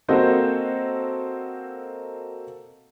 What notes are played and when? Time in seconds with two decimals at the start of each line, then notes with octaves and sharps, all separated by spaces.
0.08 A#3 C4 F#4 A4 C5 D#5